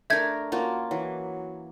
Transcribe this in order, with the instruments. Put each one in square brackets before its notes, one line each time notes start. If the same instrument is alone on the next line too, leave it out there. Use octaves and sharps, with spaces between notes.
[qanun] A3 D4 A#4 [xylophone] E5 G6 G#6
[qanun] A#3 C#4 F4 [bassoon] F#4
[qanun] E3 [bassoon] F#3